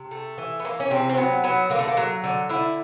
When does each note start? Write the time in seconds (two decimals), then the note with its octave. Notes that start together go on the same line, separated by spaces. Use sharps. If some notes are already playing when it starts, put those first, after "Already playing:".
Already playing: C3
0.11 A3
0.38 E3
0.60 B3
0.65 E3 A#3
0.80 C#4
0.91 C3 C4
1.09 C4
1.17 F#3 B3
1.44 F#3 B3
1.70 D3 A#3
1.79 A3
1.88 A#3
1.97 F#3
2.24 D3
2.49 D3 E4